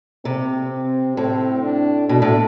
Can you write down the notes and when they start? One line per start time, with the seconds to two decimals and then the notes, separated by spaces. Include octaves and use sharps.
0.25 C3 C4
0.71 C4
1.17 A2 C4
1.63 D4
2.09 B2 D4
2.22 A2